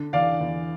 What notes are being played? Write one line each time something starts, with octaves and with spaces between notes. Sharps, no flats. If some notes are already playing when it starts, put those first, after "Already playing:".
Already playing: D3
E2 D5 F5
E2